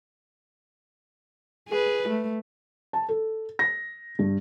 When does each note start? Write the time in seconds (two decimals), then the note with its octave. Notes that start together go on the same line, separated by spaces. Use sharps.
1.68 G#4 B4
2.08 A3
2.93 A5
3.09 A4
3.59 A#6
4.19 G2